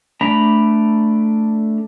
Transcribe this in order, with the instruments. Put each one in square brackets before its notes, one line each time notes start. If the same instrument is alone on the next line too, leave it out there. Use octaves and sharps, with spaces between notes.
[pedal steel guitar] A3 D4 A#5 B5